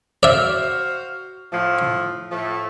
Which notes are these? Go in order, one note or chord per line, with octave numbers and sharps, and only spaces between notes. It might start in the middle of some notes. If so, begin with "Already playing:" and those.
F#4 C5 D5 E5 F5
A2 F3
A2 F3 A3